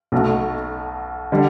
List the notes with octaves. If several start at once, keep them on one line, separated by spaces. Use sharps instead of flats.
B1 B2 A3
D3 G3